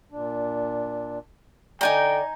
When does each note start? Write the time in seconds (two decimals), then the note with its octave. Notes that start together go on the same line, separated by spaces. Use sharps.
0.11 A#2 D4
1.81 D3 D#4 D5 G5 G#5 A#5